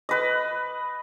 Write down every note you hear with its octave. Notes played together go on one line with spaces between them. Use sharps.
B4 D#5